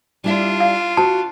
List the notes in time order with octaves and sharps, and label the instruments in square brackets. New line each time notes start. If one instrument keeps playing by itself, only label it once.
[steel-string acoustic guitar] G3 E4 E5 [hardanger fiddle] D4 F4
[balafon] F5
[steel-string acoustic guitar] F#4 [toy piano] A5